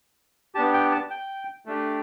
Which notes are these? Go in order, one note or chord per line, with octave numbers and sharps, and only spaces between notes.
B3 D4 G4 A5
G5
A5
G5
A3 D4 G4